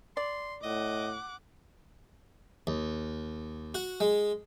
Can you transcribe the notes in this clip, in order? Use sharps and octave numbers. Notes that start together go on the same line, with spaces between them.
D5 C6
A2 D#5 F#5 D6
D#2
F#4
G#3